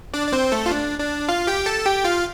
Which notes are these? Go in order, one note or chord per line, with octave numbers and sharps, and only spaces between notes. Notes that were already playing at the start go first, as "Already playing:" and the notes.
D4 D5
D5
C4 C5
A3 A4
F4
D4
D4
F4 F5
G4 G5
A4 A5
G4 G5
F4 F5